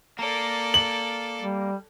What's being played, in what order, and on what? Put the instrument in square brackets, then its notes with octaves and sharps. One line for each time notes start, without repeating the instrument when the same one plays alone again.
[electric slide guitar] A#3 [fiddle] A4 D5
[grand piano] F#7
[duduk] G3